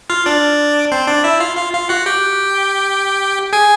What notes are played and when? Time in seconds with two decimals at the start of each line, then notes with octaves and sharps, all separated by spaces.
0.10 F4 F5
0.26 D4 D5
0.92 C4 C5
1.07 D4 D5
1.24 E4 E5
1.40 F4 F5
1.57 F4 F5
1.73 F4 F5
1.89 F#4 F#5
2.06 G4 G5
3.53 G#4 G#5